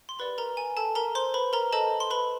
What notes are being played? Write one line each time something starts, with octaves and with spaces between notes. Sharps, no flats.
C6
G4 A#4 B4 D5 F#5 B5
A#4 A#5
G#5
A4 A5
A#4 A#5
C5 C6
B4 B5
A#4 A#5
A4 C5 D#5 A5
C6
B4 B5